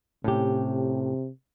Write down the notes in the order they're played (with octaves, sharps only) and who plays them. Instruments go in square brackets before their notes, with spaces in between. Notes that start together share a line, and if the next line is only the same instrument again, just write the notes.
[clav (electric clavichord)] A2 [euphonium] C3 [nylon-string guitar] C#4 G4